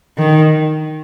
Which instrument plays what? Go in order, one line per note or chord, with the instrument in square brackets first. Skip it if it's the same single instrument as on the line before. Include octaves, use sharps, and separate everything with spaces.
[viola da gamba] D#3